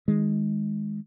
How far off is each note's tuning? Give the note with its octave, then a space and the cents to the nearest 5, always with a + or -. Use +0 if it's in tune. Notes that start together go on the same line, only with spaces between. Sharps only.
D#3 +20 G#3 +0